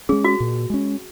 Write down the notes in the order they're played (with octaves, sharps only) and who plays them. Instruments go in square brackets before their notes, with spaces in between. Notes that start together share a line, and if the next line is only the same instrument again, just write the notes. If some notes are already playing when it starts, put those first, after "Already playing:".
[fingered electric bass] G#3 C#4 [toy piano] G#4
[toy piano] F#4
[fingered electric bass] A#2
G#3 C#4